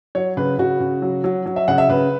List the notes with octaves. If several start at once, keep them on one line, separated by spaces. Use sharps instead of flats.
F#3 C#5
C#3 B4
C#3 F#4
C#3
F#3
F#3
F#3
E5
C#3 F#5
E5
C#3 B4